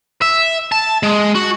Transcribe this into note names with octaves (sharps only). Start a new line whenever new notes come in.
E5
A5
G#3
F#4